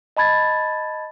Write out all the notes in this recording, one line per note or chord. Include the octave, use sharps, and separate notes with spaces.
D#5 A5 B5 G#6 A6